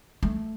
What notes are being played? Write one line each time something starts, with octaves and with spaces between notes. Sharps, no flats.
A3